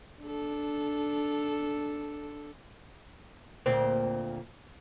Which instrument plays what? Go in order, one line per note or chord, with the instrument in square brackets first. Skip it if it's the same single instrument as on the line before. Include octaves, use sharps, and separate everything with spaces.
[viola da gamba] D4 A4
[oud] D2 A#2 C4